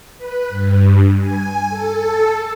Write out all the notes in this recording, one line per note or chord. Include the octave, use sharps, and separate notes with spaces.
B4
G2
G#5
A4